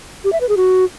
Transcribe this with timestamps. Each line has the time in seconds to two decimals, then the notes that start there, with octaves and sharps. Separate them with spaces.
0.24 G4
0.33 E5
0.41 B4
0.49 G#4
0.57 F#4